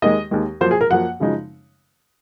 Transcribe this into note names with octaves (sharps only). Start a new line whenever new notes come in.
D#2 D#3 G#3 D#5
D#2 D#3 G#3
F#2 F3 A#3 C5
G#4
A#4
F#2 F3 A#3 F#5
F#2 C#3 F3 G#3 D#4